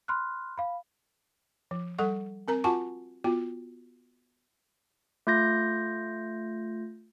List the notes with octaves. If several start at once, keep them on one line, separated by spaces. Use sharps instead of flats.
B5 C6 F6 F#6
F5 B5
F3
G3 A4 F#5 C#6
C4 A#4 A#5
F4 F#4 F#5 G#5 A5 C#6
B3 F4 F#4
A3 F4 G6 A#6